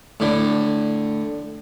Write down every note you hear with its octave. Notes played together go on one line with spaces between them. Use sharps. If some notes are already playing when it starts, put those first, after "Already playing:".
A2 D3